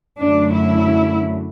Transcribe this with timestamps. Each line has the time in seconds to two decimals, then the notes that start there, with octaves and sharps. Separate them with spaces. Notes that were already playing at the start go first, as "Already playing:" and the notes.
0.19 F#2 D3 F#3 A3 D4
0.54 E4